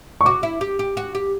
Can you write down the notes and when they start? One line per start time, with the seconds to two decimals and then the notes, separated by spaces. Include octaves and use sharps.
0.21 C#6
0.25 F#4 D6
0.43 E4
0.61 G4
0.79 G4
0.97 F#4
1.15 G4